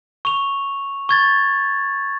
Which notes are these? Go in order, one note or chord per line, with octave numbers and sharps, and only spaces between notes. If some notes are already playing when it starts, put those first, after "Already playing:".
C#6 F7
C#6 G#6 A6